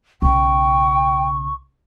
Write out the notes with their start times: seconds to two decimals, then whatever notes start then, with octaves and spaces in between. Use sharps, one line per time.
0.22 B1 C#3 G5 C#6